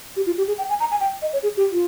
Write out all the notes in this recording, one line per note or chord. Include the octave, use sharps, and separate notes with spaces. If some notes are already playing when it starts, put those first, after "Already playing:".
G4
F4
G4
G#4
G5
G#5
A#5
G#5
G5
D#5
C#5
G#4
G4
F4